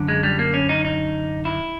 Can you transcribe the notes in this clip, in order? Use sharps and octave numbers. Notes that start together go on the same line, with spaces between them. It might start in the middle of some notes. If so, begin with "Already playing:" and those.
Already playing: F#2 D3
G#3
G3
A#3
C#4
D#4
D#4
E4